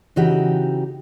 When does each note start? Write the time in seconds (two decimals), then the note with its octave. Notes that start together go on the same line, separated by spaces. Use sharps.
0.16 C#3 E3 D#4 F#4 G4